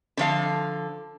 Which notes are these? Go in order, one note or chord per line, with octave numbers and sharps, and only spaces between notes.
D3 F3 F5